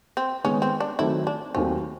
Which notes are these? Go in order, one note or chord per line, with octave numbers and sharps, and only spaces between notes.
C4
D#3 G#3 B3 C#4
C4
D4
D#3 F#3 A3 C4 E4
D4
D#2 D#3 F#3 A3 C4 C#4